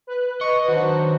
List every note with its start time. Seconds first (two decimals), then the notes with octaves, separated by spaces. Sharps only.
0.07 B4 F#6
0.41 D#5 C#6
0.68 D#3 F#3 D4 F#4 C5